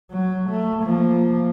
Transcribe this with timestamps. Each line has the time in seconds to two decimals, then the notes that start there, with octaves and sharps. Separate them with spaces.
0.11 F#3
0.50 A3
0.84 F3 A#3